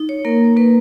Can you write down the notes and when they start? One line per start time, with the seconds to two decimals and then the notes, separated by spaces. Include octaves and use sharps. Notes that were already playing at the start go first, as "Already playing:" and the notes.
Already playing: D#4
0.09 C#5
0.25 A#3 A#4
0.57 A#3 B4